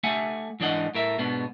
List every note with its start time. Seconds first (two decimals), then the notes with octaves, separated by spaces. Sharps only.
0.03 A3 E5 F#5 G#5
0.60 G#2 E3 D4 D#5 F#5
0.95 A2 A#4 E5
1.18 G#2 B2 B3 D4